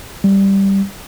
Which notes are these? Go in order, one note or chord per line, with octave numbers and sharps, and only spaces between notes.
G3